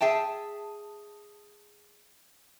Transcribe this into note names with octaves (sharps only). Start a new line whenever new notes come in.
G#4 E5 G5 A5